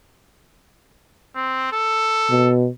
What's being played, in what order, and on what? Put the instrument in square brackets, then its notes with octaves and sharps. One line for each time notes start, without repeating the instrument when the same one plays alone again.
[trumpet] C4
A4
[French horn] B2